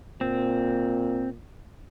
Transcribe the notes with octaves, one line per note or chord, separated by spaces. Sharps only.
A#2 C4